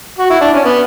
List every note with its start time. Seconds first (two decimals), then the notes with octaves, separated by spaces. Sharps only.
0.19 F#4
0.30 E4
0.41 D4
0.54 C#4
0.65 B3